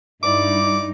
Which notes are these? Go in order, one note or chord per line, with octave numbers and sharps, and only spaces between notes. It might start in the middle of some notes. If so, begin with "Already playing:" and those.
G2 D#4 E4 D5 D6